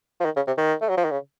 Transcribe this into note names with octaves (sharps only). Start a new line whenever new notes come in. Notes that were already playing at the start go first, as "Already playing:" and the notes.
F3
D#3
C#3
C3
D#3
A3
F#3
F3
D#3
C#3